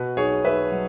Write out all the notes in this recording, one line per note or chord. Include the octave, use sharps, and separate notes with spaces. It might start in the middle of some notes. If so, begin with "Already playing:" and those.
Already playing: B2 F#4 B4
B1 G#4 C#5
B1 B4 E5
F#3